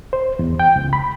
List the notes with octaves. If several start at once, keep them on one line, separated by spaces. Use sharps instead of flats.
C5
E2
G5
C#2
B5